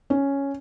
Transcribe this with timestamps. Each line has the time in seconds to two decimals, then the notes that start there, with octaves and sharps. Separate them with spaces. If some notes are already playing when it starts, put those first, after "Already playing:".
0.10 C#4